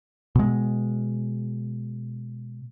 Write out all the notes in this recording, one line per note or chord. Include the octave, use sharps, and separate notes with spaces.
B2 G#3